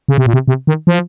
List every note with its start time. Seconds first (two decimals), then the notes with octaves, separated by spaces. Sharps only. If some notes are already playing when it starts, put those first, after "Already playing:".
0.08 C#3
0.18 C3
0.26 A#2
0.33 C3
0.48 C3
0.67 D#3
0.87 F3